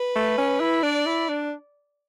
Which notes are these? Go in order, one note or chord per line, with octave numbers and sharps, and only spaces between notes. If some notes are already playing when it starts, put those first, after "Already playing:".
Already playing: B4
A3
C#4
E4
D4 D5
E4
D4